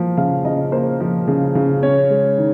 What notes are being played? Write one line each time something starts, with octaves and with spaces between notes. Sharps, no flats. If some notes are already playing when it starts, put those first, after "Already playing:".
Already playing: F3 A#3
C#3 F5
C#3 D#5
A#3 C5
F3
C#3
C#3
C#4 C#5
G#3
D#3